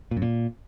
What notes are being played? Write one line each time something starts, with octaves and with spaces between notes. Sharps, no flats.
A#2
F#2
A#2